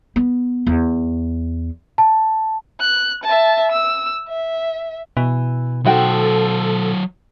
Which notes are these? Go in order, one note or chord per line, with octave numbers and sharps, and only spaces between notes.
B3
E2
A5
F#6
E5 A5
E6
E5
B2 E3
F#3 D#4 F#4 A4 C5 G5